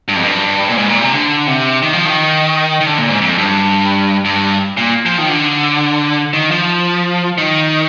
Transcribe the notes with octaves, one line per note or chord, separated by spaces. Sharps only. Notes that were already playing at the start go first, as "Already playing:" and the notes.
G2
F2
G2
A#2
G#2
A#2
C3
D3
C3
D#3
F3
D#3
D#3
D3
A#2
G#2
F2
G2
G2
A#2
F3
D#3
D3
D#3
F3
D#3